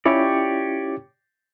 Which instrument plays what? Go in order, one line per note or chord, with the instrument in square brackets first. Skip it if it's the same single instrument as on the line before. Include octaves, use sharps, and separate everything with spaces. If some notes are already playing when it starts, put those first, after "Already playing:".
[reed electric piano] C#4 E4 F4 [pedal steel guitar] G4 C#5 D5